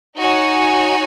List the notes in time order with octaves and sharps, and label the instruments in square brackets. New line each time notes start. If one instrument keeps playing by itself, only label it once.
[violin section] D#4 F#4 C#5 G#5